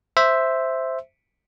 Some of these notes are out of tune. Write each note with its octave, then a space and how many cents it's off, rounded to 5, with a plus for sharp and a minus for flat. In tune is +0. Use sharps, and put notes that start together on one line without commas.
C5 +0 E5 +0